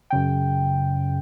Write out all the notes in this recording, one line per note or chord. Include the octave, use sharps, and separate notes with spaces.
F#2 C#3 G5